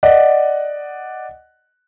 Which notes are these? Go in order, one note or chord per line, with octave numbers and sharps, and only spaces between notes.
D5 D#5 F#5